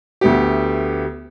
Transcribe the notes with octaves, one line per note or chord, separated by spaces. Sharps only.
D2 A3 B3 G4